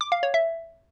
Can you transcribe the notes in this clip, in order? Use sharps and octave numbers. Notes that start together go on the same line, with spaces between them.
D6
F5
C#5
E5